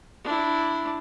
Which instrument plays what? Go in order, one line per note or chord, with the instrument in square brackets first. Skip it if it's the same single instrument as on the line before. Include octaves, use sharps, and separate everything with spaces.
[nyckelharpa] D4 E4